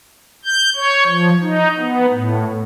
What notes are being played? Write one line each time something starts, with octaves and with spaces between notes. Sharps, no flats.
G6
C#5
F3
D#4
B3
A2